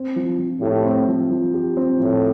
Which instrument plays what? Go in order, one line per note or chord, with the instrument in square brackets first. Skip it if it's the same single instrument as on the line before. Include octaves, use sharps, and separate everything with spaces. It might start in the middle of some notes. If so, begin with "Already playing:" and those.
Already playing: [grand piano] C4
F3
F3
[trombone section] A2 [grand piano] G4
[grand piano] C4
F3
F3
G4
C4
[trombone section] A2 [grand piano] F3